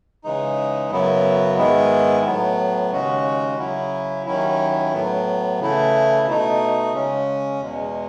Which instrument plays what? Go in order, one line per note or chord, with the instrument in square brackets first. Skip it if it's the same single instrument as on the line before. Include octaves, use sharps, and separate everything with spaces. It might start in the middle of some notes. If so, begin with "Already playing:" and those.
[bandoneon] C#3 E3 G#3 D#4
F#2 C#3 F#3 B3 E4
G#2 D#3 G#3 B3 E4
A2 F#3 B3
D#2 C#3 G#3 C#4 F#4
C#3 F#3 C#4 E4
D#2 D#3 F#3 C#4 E4
A2 F#3 B3
C#3 E3 A3 E4
B2 A3 D#4
C#3 G#3 C#4
E2 B2 G#3